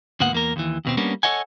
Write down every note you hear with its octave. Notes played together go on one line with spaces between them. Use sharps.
D2 G#2 A#3 B3 F#5
E2 A#3 A#4
D#2 E3
D#2 B2 C4
G3 A#3 B3 C#4 D4
A4 A#4 C#5 D#5 F#5 G#5